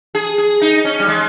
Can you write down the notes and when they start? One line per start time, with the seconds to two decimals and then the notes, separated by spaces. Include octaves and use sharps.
0.15 G#4
0.38 G#4
0.61 D#4
0.85 C#4
1.00 G3
1.08 G#3